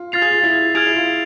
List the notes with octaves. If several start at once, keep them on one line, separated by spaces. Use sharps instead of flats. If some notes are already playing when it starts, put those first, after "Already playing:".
Already playing: F4
F4 F6 A6 C7 F7
G#4
F4
E4
G#4 F6 G#6 D7 F7
E4
F4